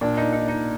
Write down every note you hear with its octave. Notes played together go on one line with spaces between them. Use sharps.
A#2 D4
D#4
D#4
D#4